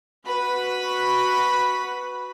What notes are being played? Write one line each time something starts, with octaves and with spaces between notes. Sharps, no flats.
F#4 B4 B5